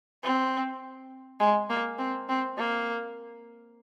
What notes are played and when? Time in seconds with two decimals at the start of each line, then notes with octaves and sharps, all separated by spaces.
0.24 C4
1.40 G#3
1.70 A#3
1.99 C4
2.29 C4
2.57 A#3